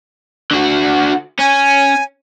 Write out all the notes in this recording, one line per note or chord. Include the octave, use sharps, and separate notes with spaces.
D3 F#4
C#4 G#5